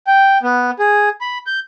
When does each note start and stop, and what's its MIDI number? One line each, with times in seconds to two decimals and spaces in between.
0.07 0.38 79
0.43 0.71 59
0.79 1.09 68
1.21 1.38 83
1.47 1.60 91